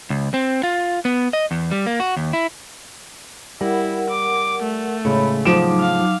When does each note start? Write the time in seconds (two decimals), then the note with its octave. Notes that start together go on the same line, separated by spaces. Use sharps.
0.10 C#2
0.34 C4
0.63 F4
1.05 B3
1.33 D#5
1.51 E2
1.71 G3
1.86 A#3
2.00 F#4
2.17 D#2
2.33 E4
3.61 G3 E4 A#4 F#5
4.10 D6
4.63 A3
5.05 A2 C#3 G#3 C#5 B5
5.45 F3 F#3 D#4 D6 D7 E7
5.80 F5